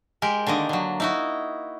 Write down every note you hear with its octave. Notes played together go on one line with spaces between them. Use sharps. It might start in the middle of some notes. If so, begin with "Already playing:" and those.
G#3 G4 A#4
D3 D#3 A#3 D#5
D3 F#3
D#4 E4 F#4